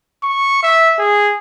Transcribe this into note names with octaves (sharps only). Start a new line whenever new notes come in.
C#6
E5
G#4